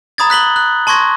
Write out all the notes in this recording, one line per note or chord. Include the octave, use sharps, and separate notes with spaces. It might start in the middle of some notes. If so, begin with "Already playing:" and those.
A#5 B5 D#6 G#6 A6
F#6 B6 F#7 G7
F#6
A5 C6 C#6 G#6 A#6